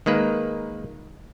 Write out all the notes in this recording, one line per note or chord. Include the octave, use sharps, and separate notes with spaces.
D#3 G#3 A#3 B4